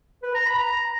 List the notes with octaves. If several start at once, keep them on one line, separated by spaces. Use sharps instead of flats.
B4
A#5
B5
A#5